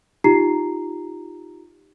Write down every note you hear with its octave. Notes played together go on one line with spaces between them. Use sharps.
D#4 F4 G4 A#5 C7